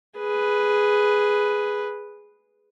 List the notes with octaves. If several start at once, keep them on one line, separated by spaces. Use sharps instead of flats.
G#4 B4